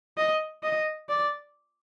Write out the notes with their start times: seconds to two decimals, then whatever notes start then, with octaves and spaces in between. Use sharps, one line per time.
0.17 D#5
0.63 D#5
1.09 D5